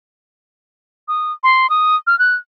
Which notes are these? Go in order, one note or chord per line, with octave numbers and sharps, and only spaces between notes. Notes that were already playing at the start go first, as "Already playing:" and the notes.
D#6
C6
D#6
F6
F#6